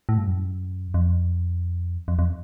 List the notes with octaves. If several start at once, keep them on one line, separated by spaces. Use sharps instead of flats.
A2
G2
F#2
F2
F2
F2